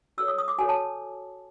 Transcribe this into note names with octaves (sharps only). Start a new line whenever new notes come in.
F#4 A4 C#5 E6
D#6
D#6
D6
F#4 A4 C#5 G#5
A5